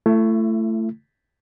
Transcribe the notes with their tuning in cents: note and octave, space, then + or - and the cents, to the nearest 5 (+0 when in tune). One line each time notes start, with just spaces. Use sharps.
A3 +10 E4 +40